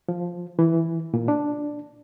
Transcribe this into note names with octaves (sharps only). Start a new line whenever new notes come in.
F3
E3
A#2
D4